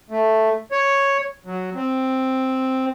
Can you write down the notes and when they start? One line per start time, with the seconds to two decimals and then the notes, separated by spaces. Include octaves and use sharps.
0.10 A3
0.72 C#5
1.46 F#3
1.75 C4